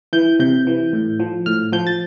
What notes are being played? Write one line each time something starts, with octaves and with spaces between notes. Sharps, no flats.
E3 G6
C3 G6
E3
A2
F3
A2 F6
F3 G6
A6